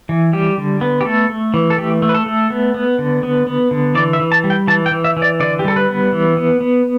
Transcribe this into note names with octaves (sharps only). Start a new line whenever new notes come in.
E3
G3 G4
D3
B3
G4
A3 A4
A3
E3
A4
A3 G4
A3
B4
A4
A3
B3
B3
D3
B3
B3
D3
E3 D5
E5
E3
A5
G3
G5
E3 A5
G5
E3
E5
E3
D5
D3 D5
G4
G3 A4
B4
B3
E3
B3
B3